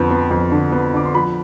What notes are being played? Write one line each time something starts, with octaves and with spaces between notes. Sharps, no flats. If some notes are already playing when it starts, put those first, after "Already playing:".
Already playing: F2 D3 B3
B3
F2
D3
B3
D3 D6
C6
F3 B5